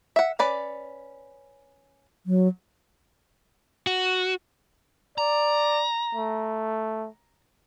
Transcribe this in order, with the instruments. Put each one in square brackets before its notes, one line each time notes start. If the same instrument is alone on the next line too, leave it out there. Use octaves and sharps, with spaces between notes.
[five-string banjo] E5 F#5
C#4 B4 D5
[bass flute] F#3
[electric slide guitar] F#4
[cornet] D5 [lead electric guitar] A#5
[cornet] A3